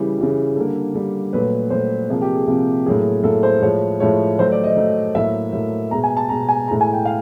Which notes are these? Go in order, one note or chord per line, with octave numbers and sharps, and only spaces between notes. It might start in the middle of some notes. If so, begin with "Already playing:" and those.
Already playing: C#3 E3 G3
C#3 E3 G3
D3 G3 A#3
D3 G3 A#3
A#2 F#3 A3 B4
A#2 F#3 A3 C5
C3 F3 A#3 G#4
G4
G#4
C3 F3 A#3
A2 F#3 A#3 G#4
A2 F#3 A#3 A4
C5
A2 F3 G#3 C#5
A2 F3 G#3 C#5
D#3 F#3 A3 C5
D5
D#5
D#3 F#3 A3
A2 F#3 A#3 E5
A2 F#3 A#3
B2 G#3 A#5
G#5
A5
B2 G#3 A#5
G#5
A2 E3 G#3 A#5
G#5
G5
F5